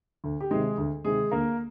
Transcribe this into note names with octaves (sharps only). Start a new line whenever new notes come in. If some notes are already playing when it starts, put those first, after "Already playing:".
D2
G4
C3 D#3 G#3 G#4
D2
C3 D#3 G#3 G#4
D2 A#3 A#4